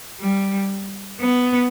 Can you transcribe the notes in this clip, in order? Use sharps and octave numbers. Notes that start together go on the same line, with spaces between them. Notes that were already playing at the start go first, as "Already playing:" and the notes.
G3
B3